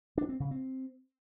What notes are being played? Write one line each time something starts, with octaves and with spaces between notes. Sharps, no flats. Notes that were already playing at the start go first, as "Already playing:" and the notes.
D4
C4
C#3
C4